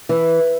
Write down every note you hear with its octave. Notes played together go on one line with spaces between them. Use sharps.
E3